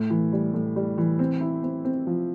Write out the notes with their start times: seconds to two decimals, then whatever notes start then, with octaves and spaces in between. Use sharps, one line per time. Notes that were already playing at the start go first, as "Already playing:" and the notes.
Already playing: A2
0.10 E3
0.33 G3
0.54 A2
0.76 G3
0.98 E3
1.19 C4
1.41 E4
1.63 C4
1.85 C4
2.07 F3